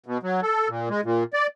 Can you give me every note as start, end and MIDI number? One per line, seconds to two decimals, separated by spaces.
0.06 0.18 47
0.23 0.41 54
0.43 0.68 69
0.68 0.89 46
0.90 1.01 56
1.04 1.24 46
1.33 1.47 74